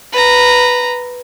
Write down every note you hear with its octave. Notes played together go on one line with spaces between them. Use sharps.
B4 A#5